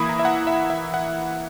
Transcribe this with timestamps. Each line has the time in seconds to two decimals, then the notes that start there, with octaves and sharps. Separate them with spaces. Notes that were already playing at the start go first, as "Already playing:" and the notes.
Already playing: E3 A#3 E4 B5 D#6
0.09 A#5
0.19 E5
0.25 F#5
0.47 E5
0.70 E5
0.94 F#5